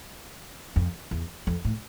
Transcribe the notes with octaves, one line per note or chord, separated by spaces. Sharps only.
F2
E2
F2
A2